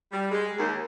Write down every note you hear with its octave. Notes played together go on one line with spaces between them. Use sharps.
G3
G#3
D#2